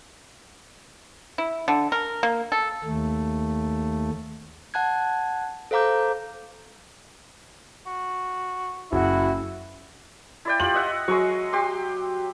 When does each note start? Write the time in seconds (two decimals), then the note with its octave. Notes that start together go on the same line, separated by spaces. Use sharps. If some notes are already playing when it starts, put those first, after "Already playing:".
1.38 E4
1.68 D3
1.92 A#4
2.23 A#3
2.52 A4
2.84 D#2 A3
4.74 F#5 A5 F#6 G#6
5.71 A4 C5 F5 A#5 D6 G6
7.86 F#4
8.92 F#1 E4 F#4
10.45 E4 D5 G5
10.60 F4 G4 F#7
10.74 D#5 E5 F#5
11.08 F#3 G#3 C#6
11.53 G4 C6 D6